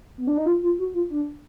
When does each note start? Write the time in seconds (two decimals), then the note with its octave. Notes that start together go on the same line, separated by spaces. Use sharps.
0.18 B3
0.27 D4
0.37 D#4
0.46 F4
0.63 F4
0.79 F#4
0.94 F4
1.10 D4